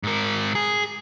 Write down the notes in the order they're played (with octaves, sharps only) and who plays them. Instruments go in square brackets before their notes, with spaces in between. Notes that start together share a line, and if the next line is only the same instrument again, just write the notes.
[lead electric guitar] G#2 A#4
G#4